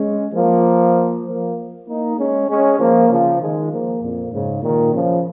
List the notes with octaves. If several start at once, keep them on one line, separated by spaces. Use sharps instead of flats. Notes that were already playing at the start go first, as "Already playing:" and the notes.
Already playing: G#3 C#4
F3 A#3
F3 A#3
A#3 D#4
G#3 C#4
G#3 C#4
F3 A#3
C#3 F3
D#3 G#3
F3 A#3
F2 A#2
G#2 C#3
A#2 D#3
C#3 F3